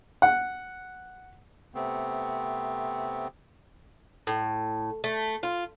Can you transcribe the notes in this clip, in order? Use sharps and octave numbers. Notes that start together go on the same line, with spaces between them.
F#5
C3 A3 B3 C4
A2
A3
F4